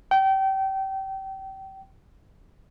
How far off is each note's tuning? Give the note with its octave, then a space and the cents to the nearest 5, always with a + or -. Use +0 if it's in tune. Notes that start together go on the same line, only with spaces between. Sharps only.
G5 -30